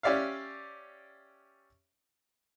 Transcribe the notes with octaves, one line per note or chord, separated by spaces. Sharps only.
C#4 G4 D5 E5 F5